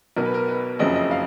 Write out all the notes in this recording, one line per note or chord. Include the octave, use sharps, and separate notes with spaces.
B1 B2 A#4
B4
A#4
B4
F#1 F2 C#3 D#5
D#5
F5